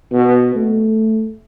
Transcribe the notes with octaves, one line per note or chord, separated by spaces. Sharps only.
B2
A3